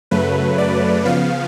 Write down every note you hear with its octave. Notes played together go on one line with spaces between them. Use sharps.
F#2 C#3 F#3 A3 B4
D5
C#3 F3 B3 F5